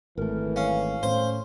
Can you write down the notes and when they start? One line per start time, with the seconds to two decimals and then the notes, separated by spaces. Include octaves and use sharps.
0.18 G#1 E3 A3 A#4
0.56 C#4 F5
1.03 A2 C#4 C5